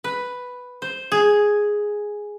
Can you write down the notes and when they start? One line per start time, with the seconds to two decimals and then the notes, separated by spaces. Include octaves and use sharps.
0.04 B4
0.82 C5
1.12 G#4